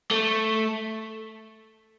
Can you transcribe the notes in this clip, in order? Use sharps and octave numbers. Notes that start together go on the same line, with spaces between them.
A3